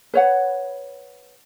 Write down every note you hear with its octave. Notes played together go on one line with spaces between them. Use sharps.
B4 C#5 F#5